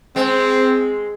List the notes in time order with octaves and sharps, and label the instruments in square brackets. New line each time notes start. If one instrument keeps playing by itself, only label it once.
[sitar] G#3 [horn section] C4